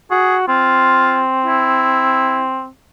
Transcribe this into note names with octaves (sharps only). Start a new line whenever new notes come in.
F#4 G#4
C4 F4
E4